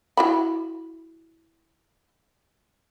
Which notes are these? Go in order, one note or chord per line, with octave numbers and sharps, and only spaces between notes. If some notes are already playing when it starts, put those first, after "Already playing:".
E4 F#4 B5